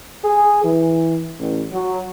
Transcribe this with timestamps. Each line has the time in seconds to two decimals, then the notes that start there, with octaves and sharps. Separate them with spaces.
0.24 G#4
0.64 E3
1.39 A1
1.73 F#3